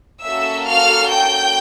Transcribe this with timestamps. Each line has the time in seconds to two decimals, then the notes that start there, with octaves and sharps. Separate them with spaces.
0.23 A#3 C#4 F#4 A4 E5 E6
0.66 F5 F6
1.10 G5 G6